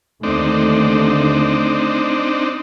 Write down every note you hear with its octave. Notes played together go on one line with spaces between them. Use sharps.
D#2 D3 A3 C4 D4 D#4